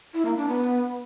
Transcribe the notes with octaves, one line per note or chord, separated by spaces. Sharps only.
E4
A#3
D4
B3